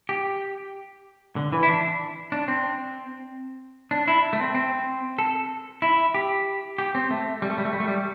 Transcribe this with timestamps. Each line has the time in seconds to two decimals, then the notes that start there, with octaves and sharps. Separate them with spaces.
0.09 G4
1.36 D3
1.52 E3
1.63 E4
1.69 D4
2.32 D4
2.48 C4
3.91 D4
4.08 E4
4.33 A3
4.40 C4
4.55 C4
5.18 A4
5.82 E4
6.14 G4
6.78 G4
6.95 C4
7.11 A3
7.42 G3
7.50 A3
7.58 G3
7.65 A3
7.73 G3
7.80 A3
7.88 G3